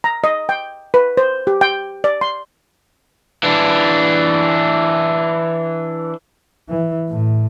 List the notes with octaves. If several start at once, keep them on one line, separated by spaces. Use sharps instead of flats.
A#5
D#5
G5
B4
C5
G4
G5
D5
C6
E3 D4
E3
A2